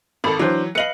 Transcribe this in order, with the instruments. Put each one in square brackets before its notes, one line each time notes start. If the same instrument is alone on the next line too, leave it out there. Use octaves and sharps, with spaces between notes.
[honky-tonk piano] G#1 A4 [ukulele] B5
[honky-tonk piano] E3 F#3 [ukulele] D4 C5
[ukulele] B4 D#5 F5 [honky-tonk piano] C#7 F#7